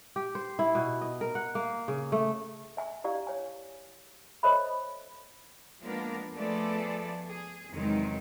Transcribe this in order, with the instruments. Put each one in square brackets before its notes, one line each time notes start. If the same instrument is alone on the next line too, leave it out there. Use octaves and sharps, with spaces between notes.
[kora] G4
C5
E4
B2
D#5
A#4
F#5
A#3
C#3
A3
[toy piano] E5 G#5
E4 G4 D5 F5
C#5 G#5
A4 C5 C#5 D#5 E5 B5
[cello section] F3 G#3 A#3 B3 D4 A#4
F3 A3 B3 G#4 A4 D5
G#4
E2 C3 D#3 F#3 G#3